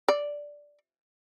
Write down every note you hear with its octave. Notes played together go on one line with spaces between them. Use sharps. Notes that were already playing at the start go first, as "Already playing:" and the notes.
D5